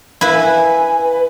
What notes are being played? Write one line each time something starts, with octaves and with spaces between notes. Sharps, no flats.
E4 B4 F5
G#5
B4